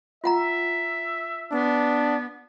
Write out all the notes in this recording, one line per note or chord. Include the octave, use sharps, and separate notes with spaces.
F4 E5 F#5 A#5
B3 D4